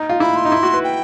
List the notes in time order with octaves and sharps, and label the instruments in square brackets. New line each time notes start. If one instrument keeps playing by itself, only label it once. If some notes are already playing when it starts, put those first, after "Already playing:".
Already playing: [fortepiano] D#4
F4
[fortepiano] E4 [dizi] B5
[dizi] C6
[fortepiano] D#4
E4
F#4
B4
[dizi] G5